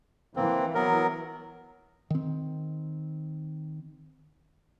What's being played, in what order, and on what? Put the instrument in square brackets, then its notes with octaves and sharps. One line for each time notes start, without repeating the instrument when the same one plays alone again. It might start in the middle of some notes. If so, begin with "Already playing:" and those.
[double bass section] E3 [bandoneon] A#3 C4
[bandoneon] F#3 B3 A#4
[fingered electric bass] D#3 C4